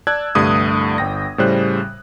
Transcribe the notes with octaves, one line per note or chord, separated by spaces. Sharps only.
D5 A5 E6 F#6 G#6
C2 G2 D3 A3 D#6
G1 G5 A#6
A2 C#3 G3 C5 F#6